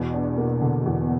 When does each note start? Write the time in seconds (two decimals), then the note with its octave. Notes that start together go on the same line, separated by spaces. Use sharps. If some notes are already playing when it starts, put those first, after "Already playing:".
Already playing: E2 B2
0.14 D4
0.38 A#3
0.62 D3
0.86 E2